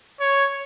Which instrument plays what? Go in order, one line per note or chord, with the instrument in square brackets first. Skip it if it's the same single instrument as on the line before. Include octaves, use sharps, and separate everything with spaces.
[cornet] C#5